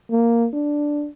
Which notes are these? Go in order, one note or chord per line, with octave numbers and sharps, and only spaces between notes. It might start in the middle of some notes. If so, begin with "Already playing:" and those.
A#3
D4